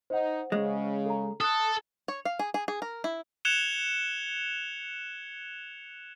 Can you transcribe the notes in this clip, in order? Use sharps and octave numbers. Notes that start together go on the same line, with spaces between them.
D#4 C5 F#5
C#3 G#3
A4 A#5
A4 D#6 F#6
C#5
F5
G#4
G#4
G#4
A#4
E4
F#6 G#6 C#7 E7 F7 G7